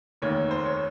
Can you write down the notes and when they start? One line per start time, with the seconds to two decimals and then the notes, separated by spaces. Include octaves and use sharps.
0.22 F1 D#2 D#3 C#5
0.51 C5
0.66 C#5